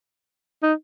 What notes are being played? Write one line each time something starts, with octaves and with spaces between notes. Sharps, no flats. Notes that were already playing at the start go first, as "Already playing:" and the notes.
D#4